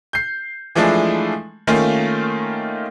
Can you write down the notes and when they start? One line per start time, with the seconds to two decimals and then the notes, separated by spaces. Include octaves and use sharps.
0.13 G6 C7
0.75 E3 F3 G#3 A3 D4 E4
1.67 D#3 A3 A#3 C#4 F4